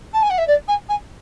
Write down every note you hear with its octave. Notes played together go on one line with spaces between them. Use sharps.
A5
G#5
F#5
E5
D5
G#5
G#5